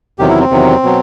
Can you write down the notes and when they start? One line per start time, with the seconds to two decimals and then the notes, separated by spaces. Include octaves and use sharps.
0.19 E2 C3 D#3 F#3 G4
0.29 E4
0.40 C4
0.51 E2 C3 D#3 F#3
0.83 B2 F#3